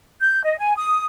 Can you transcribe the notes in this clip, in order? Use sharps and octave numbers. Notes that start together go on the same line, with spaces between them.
G6
D#5
G#5
D#6